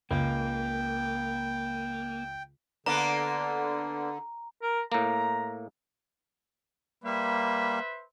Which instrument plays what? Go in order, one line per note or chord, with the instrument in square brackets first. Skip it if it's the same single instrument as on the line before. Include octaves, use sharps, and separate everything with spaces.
[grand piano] C#2 [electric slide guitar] A#3 [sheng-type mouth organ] G5
[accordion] D3 [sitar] A#3 B3 D4 [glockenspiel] A#5
[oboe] A#4
[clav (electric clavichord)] A2 A#3 [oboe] A#5
[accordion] G3 A#3 [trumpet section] B4 C5 E5